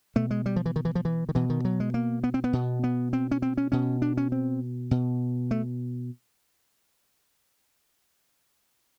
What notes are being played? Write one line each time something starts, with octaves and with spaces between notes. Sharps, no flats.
B2 A3
G#3
G3
F3
E3
D#3
E3
F3
E3
D#3
B2 E3
D#3
F#3
G#3
A#3
B3
C4
B3
B2
B3
C4
C#4
C4
C#4
B2 C#4
D4
C#4
C4
B2
A3